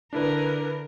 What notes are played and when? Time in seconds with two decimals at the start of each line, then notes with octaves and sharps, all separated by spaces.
0.13 D3 D4 E4 A#4 B4